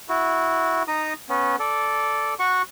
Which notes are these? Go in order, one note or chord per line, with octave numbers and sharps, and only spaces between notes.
E4 F#4
D#4 A#5 D#6
B3 C#4
A4 D5
F#4 F#5 C#6